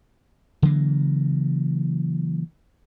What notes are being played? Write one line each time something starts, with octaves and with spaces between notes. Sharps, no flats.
C#3 E3 F#3 A#3